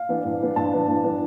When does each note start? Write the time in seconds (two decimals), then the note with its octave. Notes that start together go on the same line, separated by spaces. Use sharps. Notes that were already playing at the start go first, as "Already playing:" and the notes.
Already playing: F5
0.09 E3 B3 D4
0.25 G2
0.40 E3 B3 D4
0.56 G2 A5
0.73 E3 B3 D4
0.88 G2
1.03 E3 B3 D4